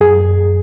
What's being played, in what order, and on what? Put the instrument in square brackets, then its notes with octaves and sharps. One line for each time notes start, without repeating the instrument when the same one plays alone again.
[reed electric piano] F#2 G#4